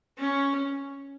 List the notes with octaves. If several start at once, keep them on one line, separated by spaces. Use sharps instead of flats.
C#4